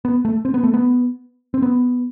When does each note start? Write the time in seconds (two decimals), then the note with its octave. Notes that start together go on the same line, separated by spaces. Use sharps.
0.05 B3
0.25 A3
0.45 C4
0.54 B3
0.64 A3
0.74 B3
1.54 C4
1.62 B3